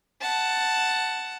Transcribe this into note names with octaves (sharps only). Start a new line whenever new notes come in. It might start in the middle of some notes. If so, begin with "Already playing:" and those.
F#5 A5